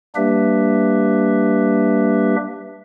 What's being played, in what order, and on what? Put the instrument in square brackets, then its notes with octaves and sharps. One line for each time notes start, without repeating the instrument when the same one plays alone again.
[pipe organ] G3 A#3 D4 G4 B4 E5